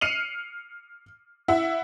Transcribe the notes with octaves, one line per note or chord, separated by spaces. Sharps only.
F6 C7 C#7 D#7 F7 F#7
E4 E5 F#5